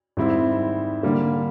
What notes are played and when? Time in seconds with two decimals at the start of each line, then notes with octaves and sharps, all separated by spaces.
0.17 G#2 D#3 G3 C4 E4
1.03 D3 G3 A#3